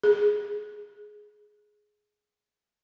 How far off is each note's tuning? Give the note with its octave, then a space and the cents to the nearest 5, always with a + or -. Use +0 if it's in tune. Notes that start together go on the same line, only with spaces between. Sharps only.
G#4 +10